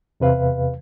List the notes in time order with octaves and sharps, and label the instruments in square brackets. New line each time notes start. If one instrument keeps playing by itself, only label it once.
[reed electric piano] E2 C3 B4 F5